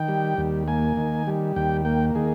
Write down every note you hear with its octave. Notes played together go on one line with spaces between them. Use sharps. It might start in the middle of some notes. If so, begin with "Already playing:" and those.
Already playing: D#3 G5
G3
D#2
A#3 G#5
D#3
G3
D#2 G5
A#3 G5
D#3 G#4